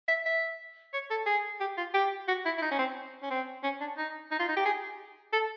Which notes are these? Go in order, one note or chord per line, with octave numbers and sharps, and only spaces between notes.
E5
E5
C#5
A4
G#4
G4
F4
G4
F#4
E4
E4
D#4
C#4
C4
C#4
C4
C#4
D4
D#4
D#4
F4
D#4
G4
G#4
A4